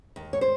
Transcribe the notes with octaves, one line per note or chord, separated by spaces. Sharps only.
D#2
C#5
C5